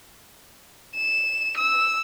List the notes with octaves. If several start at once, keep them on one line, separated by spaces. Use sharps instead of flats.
E7
E6